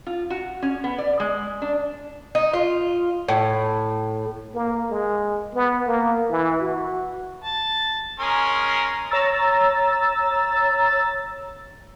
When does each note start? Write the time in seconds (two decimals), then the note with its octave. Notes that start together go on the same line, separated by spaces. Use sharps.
0.07 F4
0.30 F#4
0.62 C#4
0.84 B3
0.98 D5
1.20 G#3
1.62 D4
2.35 D#4
2.54 F4
3.28 A2
4.54 A#3
4.90 G#3
5.55 B3
5.87 A#3
6.30 E3
6.60 F#4
7.44 A5
8.20 G#3 C#4 A#4
9.11 C#5 A#5 E6 A6